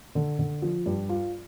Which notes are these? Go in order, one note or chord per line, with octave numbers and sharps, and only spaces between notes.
D3
D3
F3
G2
F4